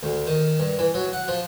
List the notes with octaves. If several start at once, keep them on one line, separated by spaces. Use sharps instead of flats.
D2
D#3
G2
E3
F#3
F#5
F3